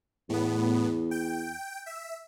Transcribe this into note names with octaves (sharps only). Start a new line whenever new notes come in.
E2 A2 B3
G5
E5